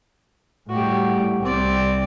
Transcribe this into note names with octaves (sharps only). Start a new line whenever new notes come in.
A2 G3 F#4 G4
C2 G3 C4 D5